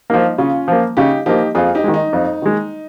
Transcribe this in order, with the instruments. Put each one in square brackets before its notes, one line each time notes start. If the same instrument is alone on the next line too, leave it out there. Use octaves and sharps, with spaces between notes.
[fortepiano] F3 A#3 [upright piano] D#4
[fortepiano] C#3 [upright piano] C#4 F4
[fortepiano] F3 A#3
[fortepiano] C#3 [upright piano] D#4 G4
[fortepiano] F3 A#3 [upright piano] D#4 G4
[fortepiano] F2 [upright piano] F4 G#4
[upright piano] D#4 G4
[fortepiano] D#3 G#3
[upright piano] D#4
[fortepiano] F2
D#3 G#3